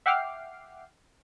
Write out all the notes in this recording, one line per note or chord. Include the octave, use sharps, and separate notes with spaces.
E5 F#5 G5 D6 F6 C7